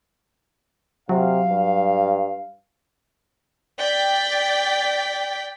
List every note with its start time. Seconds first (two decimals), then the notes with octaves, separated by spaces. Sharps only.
1.09 C3 F#3 F5
1.50 G2
3.78 D5 G5 B6